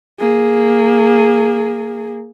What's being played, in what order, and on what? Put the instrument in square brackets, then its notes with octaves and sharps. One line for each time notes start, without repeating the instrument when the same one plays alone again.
[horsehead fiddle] A#3 G#4